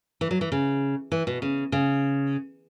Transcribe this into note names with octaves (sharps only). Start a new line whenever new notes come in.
E3
F#3
E3
C#3
E3
B2
C#3
C#3